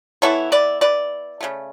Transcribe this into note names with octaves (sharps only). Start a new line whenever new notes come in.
E3 B3 E4 A4 C#5
B4 D5
B4 D5
C#3 F#3 A3